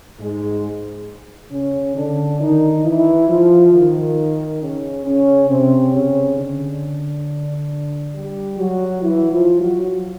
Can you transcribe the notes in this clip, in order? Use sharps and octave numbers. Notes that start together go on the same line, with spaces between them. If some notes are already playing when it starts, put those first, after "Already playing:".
G#2 G#3
C#3 C#4
D3 D4
D#3 D#4
E3 E4
F3 F4
D#3 D#4
C#3 C#4
C#3 C#4
C3 C4
C#3 C#4
D3 D4
G3 G4
F#3 F#4
E3 E4
F3 F4
F#3 F#4